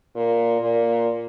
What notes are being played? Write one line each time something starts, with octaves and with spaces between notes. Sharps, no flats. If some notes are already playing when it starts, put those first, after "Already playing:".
A#2
A#2